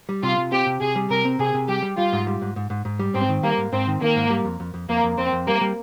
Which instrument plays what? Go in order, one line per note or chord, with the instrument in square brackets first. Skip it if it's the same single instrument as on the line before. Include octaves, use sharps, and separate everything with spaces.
[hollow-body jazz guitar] G3
[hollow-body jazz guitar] C3 [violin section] F4
[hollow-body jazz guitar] C3
[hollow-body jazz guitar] C4 [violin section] G4
[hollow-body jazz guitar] C3
[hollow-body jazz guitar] C3 [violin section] G#4
[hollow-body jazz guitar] G3
[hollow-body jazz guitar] C3 [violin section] A#4
[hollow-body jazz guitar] C4
[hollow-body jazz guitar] C3 [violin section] G#4
[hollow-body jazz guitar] C3
[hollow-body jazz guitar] G3 [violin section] G4
[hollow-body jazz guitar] G3
[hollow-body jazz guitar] G3 [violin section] F4
[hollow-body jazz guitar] G#2
G3
G#2
G#2
G#2
G#2
G3
[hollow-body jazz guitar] G#2 [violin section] C4
[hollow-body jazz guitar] D#3
[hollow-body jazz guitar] G3 [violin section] A#3
[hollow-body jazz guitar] G#2
[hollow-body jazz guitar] G#2 [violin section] C4
[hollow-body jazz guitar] D#3
[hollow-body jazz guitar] D#3 [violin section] A#3
[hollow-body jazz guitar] G#2
G3
F2
F2
F2
[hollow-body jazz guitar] F2 [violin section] A#3
[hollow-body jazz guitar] F2
[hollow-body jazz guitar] F2 [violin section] C4
[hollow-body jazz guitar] F2
[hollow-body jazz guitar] G3 [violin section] A#3
[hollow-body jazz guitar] G3